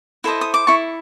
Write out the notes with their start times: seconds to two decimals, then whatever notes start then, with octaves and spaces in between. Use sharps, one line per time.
0.24 E4 A4 C5 D#5
0.41 D#6
0.54 D6
0.67 E4 A4 C#6